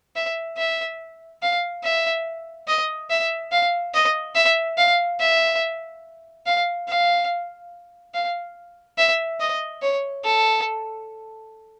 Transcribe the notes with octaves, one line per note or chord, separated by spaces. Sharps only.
E5
E5
F5
E5
D#5
E5
F5
D#5
E5
F5
E5
F5
F5
F5
E5
D#5
C#5
A4